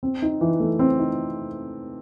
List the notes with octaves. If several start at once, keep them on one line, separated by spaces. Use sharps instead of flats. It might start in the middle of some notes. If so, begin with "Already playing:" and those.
C4
D#4
E3
A3
C4
D#4